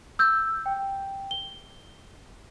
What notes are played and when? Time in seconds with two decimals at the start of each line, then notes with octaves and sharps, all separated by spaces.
0.19 E6 G6
0.66 G5
1.31 G7